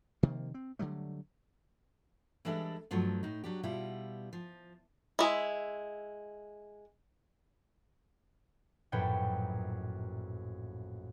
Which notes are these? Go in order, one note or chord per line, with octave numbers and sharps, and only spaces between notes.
C3 D#3 F3 A#3
C4
D3 F#3 G3 A3
E3 G3 G#3 D4 A4 E5
G2 F3 F#3 A3
A2 D#4
F#3 D4 G4
B2 G3 E4 F4
F3
G#3 E4
A#1 F#2 A2 B4 C#5 G5